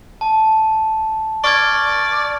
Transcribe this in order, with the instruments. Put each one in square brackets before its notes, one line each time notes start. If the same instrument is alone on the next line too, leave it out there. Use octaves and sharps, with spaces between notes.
[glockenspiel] A5
[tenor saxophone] D5 [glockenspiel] C#6 F6 G#6